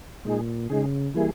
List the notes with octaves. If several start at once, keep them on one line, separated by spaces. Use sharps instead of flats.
A#2 G#3 D#4 G#4
C#3 G#3 D#4 G#4
E3 G3 A#3 E4 G#4